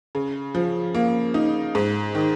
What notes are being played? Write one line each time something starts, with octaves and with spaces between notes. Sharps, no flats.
C#3
F3
A#3
D#4
G#2
D#3